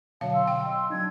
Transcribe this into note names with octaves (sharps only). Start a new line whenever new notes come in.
B2 D3 F#3 C#5 E5 F5 A5
C6 E6
G5
D#5
F#3 D4 D#4 A5 G#6